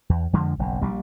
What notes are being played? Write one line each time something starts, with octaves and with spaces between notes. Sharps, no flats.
E2
F2 D3 F3 G#3
F#1 B1
A#1 G3